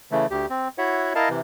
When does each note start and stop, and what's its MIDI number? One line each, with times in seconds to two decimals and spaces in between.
0.11 0.26 49
0.11 0.26 52
0.11 0.26 57
0.31 0.46 38
0.31 0.46 67
0.50 0.68 60
0.78 1.13 64
0.78 1.13 66
0.78 1.13 73
0.78 1.13 76
0.78 1.13 78
1.15 1.29 64
1.15 1.29 70
1.15 1.29 75
1.15 1.29 77
1.15 1.29 81
1.30 1.41 48
1.30 1.41 52